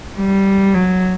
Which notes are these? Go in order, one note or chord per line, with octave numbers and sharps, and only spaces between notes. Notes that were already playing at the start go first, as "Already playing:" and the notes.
G3
F#3